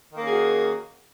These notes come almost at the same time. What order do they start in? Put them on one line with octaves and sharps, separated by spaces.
D#3 A#3 C#4 G#4 F#4